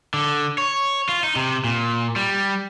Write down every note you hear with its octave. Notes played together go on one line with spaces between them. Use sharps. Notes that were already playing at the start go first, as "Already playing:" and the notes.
D3
C#5
F4
D#4
C3
A#2
G3